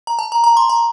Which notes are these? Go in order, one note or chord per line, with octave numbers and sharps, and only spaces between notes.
A#5
A5
A#5
A#5
C6
A#5